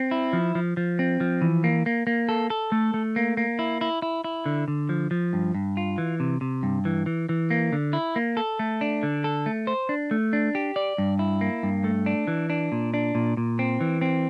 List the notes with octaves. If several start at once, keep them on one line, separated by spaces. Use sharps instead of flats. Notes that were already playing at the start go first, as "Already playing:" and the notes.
Already playing: C4
E4
F3
F3
F3
C4
F3
E3
A#3
A#3
A#3
A4
A4
A3
A3
A#3
A#3
E4
E4
E4
E4
D3
D3
F3
F3
G2
G2
F4
E3
C3
C3
G2
E3
E3
E3
A#3
D3
E4
A#3
A4
A3
D4
D3
A4
A3
C5
D4
A3
D4
G4
D5
G2
E4
A#3
G2
A3
D4
E3
D4
A#2
D4
A#2
A#2
C4
E3
C4